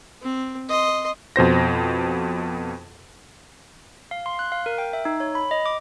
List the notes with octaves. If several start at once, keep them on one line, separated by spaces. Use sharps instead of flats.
C4
D#5 C6
F2 B2 C5 A#6
F5
C6
F#6
F5
A#4
G5
E5
D#4
C#5
B5
D#5
D6